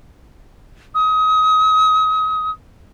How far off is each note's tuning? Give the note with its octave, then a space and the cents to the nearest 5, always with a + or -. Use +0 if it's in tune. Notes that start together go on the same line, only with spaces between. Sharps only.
D#6 +30